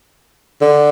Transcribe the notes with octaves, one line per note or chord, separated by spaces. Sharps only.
D3